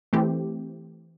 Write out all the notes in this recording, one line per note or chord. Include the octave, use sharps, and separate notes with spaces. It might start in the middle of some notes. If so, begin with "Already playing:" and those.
E3 A3 C4 G4